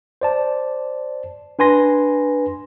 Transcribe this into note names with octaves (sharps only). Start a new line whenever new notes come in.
C5 D5 A5
D4 B4 G#5 C6 A#6